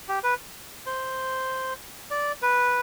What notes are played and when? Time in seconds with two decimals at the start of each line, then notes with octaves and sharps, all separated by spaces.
0.08 G4
0.23 B4
0.86 C5
2.11 D5
2.42 B4